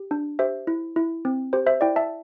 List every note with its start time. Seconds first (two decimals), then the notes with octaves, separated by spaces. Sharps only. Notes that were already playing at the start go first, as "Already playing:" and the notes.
Already playing: G4
0.11 D4
0.39 G4 C5 E5
0.67 E4
0.96 E4
1.25 C4
1.53 G4 C5
1.67 C5 E5
1.81 E4 D5 G5
1.96 E5 A5